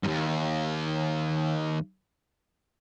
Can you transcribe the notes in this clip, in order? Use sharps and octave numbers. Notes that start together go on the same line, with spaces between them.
D#2 G#2